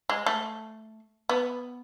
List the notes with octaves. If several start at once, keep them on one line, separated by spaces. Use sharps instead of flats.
G#3
A3
B3